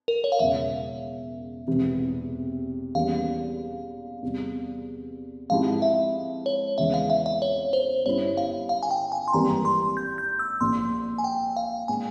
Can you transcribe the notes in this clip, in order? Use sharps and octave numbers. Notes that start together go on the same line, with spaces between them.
A#4
C#5
F5
E1 E2 C#3 F3 E5
E1 E2 C3 E3
E2 E3 G3 A#3 C#4 F5
E2 C3 G3
G#2 F3 C4 E4 G4 F5
E5
C#5
E2 C#3 E3 G#3 E5
F5
E5
E5
C#5
C5
G1 G2 G3 C#4 E4 C#5
F5
F5
G#5
G5
G#5
C6
G#1 G2 E3 G3 A#3 A#5
C6
G6
G6
E6
A#1 A#2 F3 C6
G#5
G5
F5
A#2 G#3 G#5